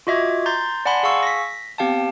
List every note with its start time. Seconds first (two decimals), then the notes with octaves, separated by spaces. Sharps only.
0.07 F4 F#4 D#5 E5 D6 G#6
0.46 A#5 C6 G6 A6
0.85 D5 F#5 G#5 A5 B5 C6
1.03 G#4 F5 G#5 C#6 E6
1.23 A#6 B6
1.78 B3 C4 G4 F5 G5 A5